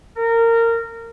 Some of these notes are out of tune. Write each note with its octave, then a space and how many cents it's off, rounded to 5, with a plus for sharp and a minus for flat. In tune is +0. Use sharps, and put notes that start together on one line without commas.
A#4 -20